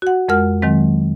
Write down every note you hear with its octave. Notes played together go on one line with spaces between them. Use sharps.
F#4 F#5
F2 G#3 A#4 F#5 F6
D#3 F#3 G#3 C4